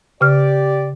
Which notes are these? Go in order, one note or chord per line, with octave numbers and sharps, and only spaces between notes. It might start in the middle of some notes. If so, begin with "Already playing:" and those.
C#3 G4 D5 F6